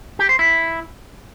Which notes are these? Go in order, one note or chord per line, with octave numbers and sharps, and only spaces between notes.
G4
C5
E4